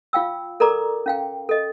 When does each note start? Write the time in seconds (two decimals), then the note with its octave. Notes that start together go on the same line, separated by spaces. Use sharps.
0.13 F4 F5 G5 E6
0.60 A4 A#4 D5 A#5 D6
1.06 C#4 F5 G5
1.49 A4 D#5